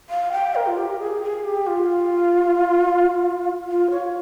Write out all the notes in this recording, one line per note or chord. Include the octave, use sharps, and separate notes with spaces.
F5
G5
A#4
F4
G4
G#4
G#4
G4
F4
F4
C#5